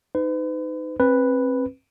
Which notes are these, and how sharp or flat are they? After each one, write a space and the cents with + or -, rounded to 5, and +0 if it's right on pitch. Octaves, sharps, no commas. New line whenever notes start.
D#4 +0 B4 +40
C4 +35 B4 +0